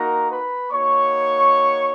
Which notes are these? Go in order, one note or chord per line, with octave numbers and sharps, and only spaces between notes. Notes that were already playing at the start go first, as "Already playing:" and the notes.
Already playing: A#3 D#4 F#4 A#4 A#5
B4 B5
A#3 D#4 F#4 C#5 C#6